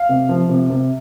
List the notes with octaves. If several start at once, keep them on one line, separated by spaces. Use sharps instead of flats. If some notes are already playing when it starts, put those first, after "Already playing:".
Already playing: F5
C3
F3
C3
C3